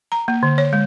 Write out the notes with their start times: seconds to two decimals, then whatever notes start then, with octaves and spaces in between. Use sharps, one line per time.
0.12 A#5
0.28 A#3
0.43 D3
0.58 C#5
0.73 G#3